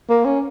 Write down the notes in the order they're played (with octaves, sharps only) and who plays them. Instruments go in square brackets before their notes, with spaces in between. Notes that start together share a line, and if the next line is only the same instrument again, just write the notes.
[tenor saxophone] A#3
C#4